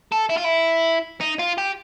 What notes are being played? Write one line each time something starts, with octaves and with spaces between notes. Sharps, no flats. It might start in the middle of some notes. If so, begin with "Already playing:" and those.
A4
E4
F4
E4
D#4
F4
G4